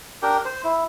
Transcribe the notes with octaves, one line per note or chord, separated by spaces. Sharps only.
D4 G4 A#4 G5
C5
E4